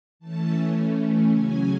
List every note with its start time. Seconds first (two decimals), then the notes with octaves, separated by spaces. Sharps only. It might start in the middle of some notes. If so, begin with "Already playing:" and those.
0.19 E3 A3 C#4 A5
1.29 C#3 F#3 C#4 G#5